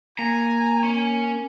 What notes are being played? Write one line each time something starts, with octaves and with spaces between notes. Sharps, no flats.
A#3 G#5 A#5
C#4